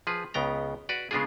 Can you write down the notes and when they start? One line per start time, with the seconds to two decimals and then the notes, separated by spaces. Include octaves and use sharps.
0.07 F3 G#4 B4
0.34 C#2 C#3 B3 G5 A#5
0.89 F#4 B4 D5
1.11 C#3 G#3 B3 D4 F4 G#4